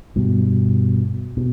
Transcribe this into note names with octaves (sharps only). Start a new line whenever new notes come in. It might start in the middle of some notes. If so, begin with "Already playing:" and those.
G2 B2
B2